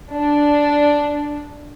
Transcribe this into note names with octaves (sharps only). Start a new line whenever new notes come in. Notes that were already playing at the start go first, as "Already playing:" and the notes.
D4